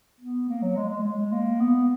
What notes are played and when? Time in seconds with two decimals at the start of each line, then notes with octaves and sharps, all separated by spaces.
0.21 B3
0.49 A#3
0.62 F#3
0.77 G#3
0.90 G#3
1.03 G#3
1.32 A#3
1.60 B3